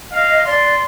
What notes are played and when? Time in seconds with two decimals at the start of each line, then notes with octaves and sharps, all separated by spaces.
0.12 D#5 F5
0.46 D5 C6